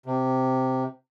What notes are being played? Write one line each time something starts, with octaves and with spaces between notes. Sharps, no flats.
C3